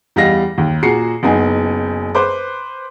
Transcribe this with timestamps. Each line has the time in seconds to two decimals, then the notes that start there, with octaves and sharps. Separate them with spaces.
0.16 E2 G3 D#5 F5 A#6
0.58 D#2
0.83 A#2 F#4 G#4 A#5 C7 C#7
1.23 F#1 B3 D#4 G#5
2.15 B4 C5 D6